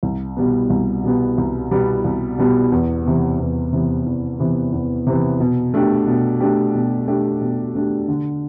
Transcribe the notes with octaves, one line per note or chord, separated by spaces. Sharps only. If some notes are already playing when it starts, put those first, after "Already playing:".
C2
B2 G3 B3
C2
B2 G3 B3
C2
B2 G3 B3
C2
B2 G3 B3
E2
C3 E3 B3
E2
C3 E3 B3
E2
C3 E3 B3
E2
C3 E3 B3
B2
A3 D4 G4
B2
A3 D4 G4
B2
A3 D4 G4
B2
A3 D4 G4
D3